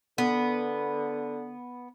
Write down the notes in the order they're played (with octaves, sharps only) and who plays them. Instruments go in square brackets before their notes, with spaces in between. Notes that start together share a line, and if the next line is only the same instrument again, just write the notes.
[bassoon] D3 [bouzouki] B3